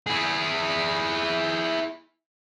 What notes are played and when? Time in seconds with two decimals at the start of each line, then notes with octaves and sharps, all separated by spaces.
0.07 E4 G#4